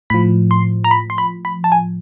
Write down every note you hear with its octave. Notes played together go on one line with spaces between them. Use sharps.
A2 F3 B5
C6
A#5
B5
C6
B5
B5
A5
G#5